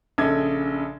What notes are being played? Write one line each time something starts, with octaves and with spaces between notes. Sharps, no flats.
A#1 C#3 A4 D#5 G#6